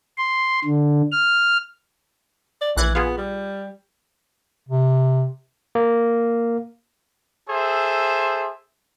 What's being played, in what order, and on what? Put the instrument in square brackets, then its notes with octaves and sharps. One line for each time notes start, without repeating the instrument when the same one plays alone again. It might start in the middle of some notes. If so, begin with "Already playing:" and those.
[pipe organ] C6
D3
F6
[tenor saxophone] D5
[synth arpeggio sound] A#1 F#6 G#6 [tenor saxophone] E3
[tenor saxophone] B3 [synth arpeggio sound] F4 G#4
[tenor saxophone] G3
[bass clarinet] C3
[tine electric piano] A#3
[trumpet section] G#4 A4 C5 E5